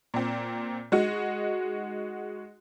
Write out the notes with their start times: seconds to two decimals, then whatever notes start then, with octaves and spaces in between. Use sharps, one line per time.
0.14 A#2 C4
0.92 G#3 D#4 F#4